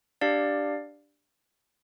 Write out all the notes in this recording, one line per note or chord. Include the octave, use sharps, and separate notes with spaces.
D4 G4 D5 F5